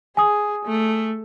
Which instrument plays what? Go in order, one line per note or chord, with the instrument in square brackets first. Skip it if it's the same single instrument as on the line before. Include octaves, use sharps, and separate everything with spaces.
[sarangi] G#4 [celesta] G#5 D#6
[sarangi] A3